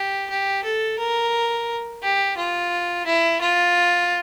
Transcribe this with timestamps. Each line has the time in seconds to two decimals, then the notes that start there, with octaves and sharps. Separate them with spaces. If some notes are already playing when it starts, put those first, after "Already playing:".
Already playing: G4
0.29 G4
0.64 A4
0.98 A#4
2.03 G4
2.37 F4
3.06 E4
3.41 F4